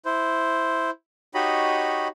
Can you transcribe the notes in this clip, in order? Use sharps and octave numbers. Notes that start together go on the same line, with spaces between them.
E4 C5
D#4 F#4 G4 C#5 D#5 B5